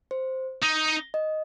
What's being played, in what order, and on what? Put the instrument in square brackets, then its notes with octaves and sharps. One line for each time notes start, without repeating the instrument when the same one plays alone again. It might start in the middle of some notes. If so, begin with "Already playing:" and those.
[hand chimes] C5
[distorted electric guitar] D#4
[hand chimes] D#5